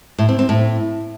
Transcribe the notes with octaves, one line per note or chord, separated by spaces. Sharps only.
A2
C4
C4
A2